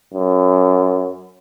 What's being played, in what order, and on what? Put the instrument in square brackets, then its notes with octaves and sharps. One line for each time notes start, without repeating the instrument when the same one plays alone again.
[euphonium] F#2